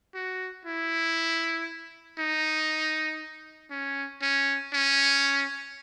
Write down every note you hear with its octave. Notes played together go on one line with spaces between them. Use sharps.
F#4
E4
D#4
C#4
C#4
C#4